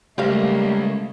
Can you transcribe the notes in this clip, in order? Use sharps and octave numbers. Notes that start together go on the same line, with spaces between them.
C#2 G3 A3 A#3 G4 C5 F5